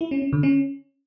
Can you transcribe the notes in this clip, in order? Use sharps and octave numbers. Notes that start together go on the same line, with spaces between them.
E4
C#4
C#4
D3
C#4